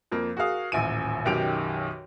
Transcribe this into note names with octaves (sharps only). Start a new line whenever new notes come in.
F2 A#3
F#4 G#4 A#4 F5 D#6
D#1 A1 E5 G#5 D7 D#7
B1 F#2 D#3 G4 D7 F7